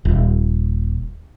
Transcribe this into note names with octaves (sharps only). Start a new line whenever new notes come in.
D#1